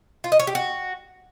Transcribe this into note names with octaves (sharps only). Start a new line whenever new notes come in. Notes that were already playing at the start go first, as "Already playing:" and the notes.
F4
D#5
C#5
G4
F#4